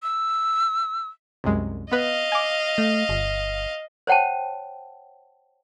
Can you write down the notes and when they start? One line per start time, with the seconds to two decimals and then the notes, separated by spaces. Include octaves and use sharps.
0.03 E6
1.44 C2 F#2 G#3
1.92 B3 B4 D#5 F5
2.32 G#5 D6
2.78 A3
3.09 G1
4.07 C5 C#5 F#5 G5 A5